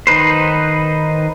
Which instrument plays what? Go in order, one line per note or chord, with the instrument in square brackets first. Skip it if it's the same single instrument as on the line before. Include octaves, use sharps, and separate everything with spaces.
[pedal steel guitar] D#3 D#4 B4 C5